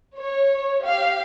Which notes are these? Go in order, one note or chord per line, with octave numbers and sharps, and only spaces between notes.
C#5
G4 F5